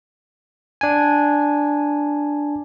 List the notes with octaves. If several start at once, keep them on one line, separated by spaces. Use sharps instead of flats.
D4 G#5